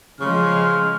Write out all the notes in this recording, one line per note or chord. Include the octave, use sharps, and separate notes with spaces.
C#3 F3 G#3 C6 C#6 F6